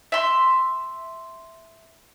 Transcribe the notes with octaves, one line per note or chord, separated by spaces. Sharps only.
E5 C6